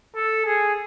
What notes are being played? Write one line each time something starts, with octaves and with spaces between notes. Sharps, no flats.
A4
G#4